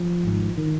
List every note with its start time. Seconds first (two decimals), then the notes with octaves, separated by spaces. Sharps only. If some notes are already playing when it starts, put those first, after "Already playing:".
Already playing: F3
0.23 G#1 G#2
0.58 D#3